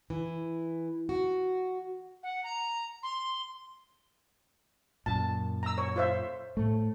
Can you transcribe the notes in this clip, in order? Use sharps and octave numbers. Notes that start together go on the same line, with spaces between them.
E3
F#4
F#5
A#5
C6
F#2 A#2 A5
A#5 E6
C#5
F4 C5 E5
A2 A3